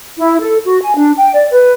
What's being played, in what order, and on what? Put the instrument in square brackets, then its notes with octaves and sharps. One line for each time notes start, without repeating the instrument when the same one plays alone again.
[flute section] E4
A4
F#4
G#5
D4
G5
D5
B4